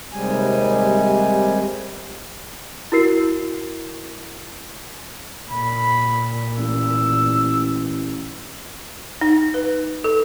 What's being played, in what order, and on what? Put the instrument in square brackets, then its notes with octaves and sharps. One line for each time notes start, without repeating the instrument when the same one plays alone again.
[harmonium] D#2 C3 G3 G#3 G#5
[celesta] E4 F#4 A#4 C7
[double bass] A#2 [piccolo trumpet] B5
[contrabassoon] A1 [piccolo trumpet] E6
[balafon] D#4
B4
A4